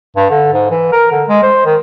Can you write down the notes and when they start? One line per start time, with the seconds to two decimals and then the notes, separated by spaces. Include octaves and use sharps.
0.16 G2
0.30 D3
0.53 G#2
0.70 E3
0.92 A#4
1.12 D3
1.28 G#3
1.43 C5
1.66 D#3